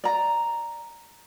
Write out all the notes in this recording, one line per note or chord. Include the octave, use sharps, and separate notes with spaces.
D5 A#5